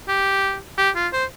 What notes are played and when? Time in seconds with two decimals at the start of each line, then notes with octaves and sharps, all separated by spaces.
0.08 G4
0.78 G4
0.95 F4
1.13 C5